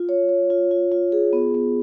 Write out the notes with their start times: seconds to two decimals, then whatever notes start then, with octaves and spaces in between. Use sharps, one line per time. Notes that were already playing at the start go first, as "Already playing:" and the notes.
Already playing: F4
0.09 C#5
0.29 C#5
0.50 F4
0.71 F4
0.92 F4
1.12 G#4
1.33 B3
1.54 B3